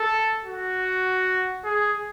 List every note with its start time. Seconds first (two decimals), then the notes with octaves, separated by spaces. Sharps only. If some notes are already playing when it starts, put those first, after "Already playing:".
Already playing: A4
0.45 F#4
1.64 G#4